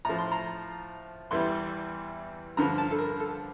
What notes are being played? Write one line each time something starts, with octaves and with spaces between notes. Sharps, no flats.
A2 F3 A#5
C6
A#5
E2 E3 G3 C6
G2 D3 F3 A#5
A5
A4
A#4
A4